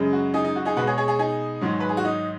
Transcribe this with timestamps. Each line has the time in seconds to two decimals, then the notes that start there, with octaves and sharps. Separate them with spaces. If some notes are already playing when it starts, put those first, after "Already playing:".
Already playing: F#2 C#3 G#3
0.13 F#4
0.34 D#4 G#4
0.44 D#4
0.56 F#4
0.65 D#4 G#4
0.76 B2 G#3 F#4 B4
0.87 G#4 C#5
0.98 G#4 C#5
1.08 G#4 C#5
1.19 D#4 G#4
1.61 G#2 D#3 F#3
1.80 B4
1.89 G#4
1.97 F#4
2.05 D#4